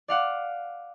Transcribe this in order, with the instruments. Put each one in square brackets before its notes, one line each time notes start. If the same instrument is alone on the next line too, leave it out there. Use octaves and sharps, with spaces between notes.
[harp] D5 F5 F#5